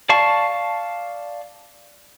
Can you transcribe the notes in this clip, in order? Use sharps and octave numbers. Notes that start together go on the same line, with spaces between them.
D5 F5 A5 C#6